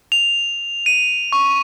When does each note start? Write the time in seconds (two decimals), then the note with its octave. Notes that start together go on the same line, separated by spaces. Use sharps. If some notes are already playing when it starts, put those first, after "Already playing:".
0.12 F7
0.86 D#7
1.32 C#6